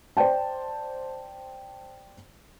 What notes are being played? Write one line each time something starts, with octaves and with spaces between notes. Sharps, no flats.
C5 D5 G5 A5